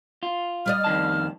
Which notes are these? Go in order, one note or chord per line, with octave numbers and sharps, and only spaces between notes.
F4
G3 D5 D#5 F6
F2 D#3 A5